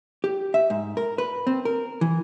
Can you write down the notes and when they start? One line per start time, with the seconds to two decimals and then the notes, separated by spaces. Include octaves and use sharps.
0.24 G4
0.54 E5
0.70 G#2
0.97 A#4
1.18 B4
1.47 C4
1.65 A#4
2.01 E3